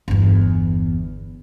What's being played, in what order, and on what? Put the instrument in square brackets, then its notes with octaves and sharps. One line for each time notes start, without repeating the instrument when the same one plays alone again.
[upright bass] G1 E2